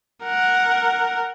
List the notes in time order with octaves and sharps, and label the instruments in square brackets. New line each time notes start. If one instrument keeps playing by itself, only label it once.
[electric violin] A#4 F#5